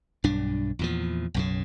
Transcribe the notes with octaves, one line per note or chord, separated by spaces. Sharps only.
B1 G2 D4
E2 A#2 F3
B1 F#2 C#3